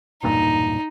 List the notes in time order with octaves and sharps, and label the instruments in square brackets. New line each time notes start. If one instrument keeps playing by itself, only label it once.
[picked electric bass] E1 G2 A#2 [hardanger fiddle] D#4